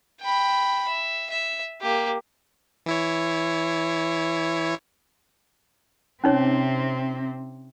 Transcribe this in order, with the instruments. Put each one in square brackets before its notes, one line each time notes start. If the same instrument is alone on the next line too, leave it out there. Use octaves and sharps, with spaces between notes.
[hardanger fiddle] G5 B5
E5
E5
A#3 G4
[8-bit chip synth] E3 E4 C#5
[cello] C3 C4 [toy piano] C#4 D#4 C#5